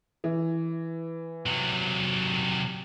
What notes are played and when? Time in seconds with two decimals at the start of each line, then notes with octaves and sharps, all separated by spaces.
0.24 E3
1.46 C3 F#3